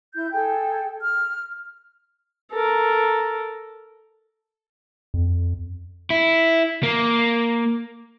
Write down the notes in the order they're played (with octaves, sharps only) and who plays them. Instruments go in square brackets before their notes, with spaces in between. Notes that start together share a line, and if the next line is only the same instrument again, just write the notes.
[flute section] E4 G6
G#4 A4 G5
F6
[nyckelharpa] A4 A#4
[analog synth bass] F2
[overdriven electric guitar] E4
A#3